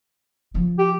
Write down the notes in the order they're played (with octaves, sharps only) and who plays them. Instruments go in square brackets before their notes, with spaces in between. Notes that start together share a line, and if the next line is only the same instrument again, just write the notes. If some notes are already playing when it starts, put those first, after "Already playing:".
[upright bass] C#3 F3
[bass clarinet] G4